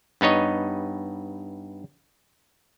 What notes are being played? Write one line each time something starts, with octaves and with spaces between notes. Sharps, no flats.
G2 B3 D#4 C#5 D#5